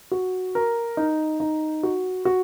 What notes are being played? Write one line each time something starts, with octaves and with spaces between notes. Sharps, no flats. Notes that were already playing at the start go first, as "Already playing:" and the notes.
F#4
A#4
D#4
D#4
F#4
F#4